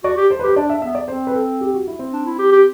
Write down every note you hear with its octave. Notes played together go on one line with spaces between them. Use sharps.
F#4 D5
G4
C5
B4
G4
C5
D4 D5
E5
B3 E5
D5
C4 C5
B4
A4
G4
F#4
E4
C4
D4
E4
G4
G4